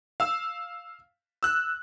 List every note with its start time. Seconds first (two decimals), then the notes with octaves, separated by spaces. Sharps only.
0.20 F5 E6
1.43 E6 F#6